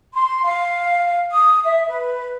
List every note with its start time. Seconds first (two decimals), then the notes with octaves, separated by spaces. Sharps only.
0.13 C6
0.44 F5
1.31 D#6
1.63 E5
1.87 B4